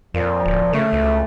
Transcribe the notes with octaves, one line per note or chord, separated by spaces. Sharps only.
F2 A#2 F3
D1
C#3 A3
C#2